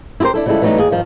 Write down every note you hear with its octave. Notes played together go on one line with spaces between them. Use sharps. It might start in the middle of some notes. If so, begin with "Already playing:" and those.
E4 G4 G#4 A#4 C5
D4 E4 A4
C#3 F3 G3 G#3 E4 A4
E3 F#3 G3 A3 B3 D#4
D#2 G#4
G2 D#3 F3